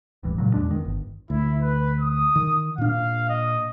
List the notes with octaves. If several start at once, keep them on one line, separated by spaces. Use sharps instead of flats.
D1 A1 G2 E3
A#2 C#3 F#3
E2 G#3 D4
E2 D#3
G1
D2 E4
B4
D#6
D#3
A#2 D4 F5
D#5